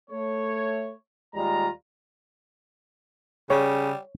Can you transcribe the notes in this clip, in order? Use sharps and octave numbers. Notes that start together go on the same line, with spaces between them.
A3 C#5
D#2 G3 G#3 F4 A#5
C#3 G3 C#5